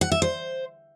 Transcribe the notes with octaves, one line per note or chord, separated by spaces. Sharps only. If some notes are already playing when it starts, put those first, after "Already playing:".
F#5
E5
C5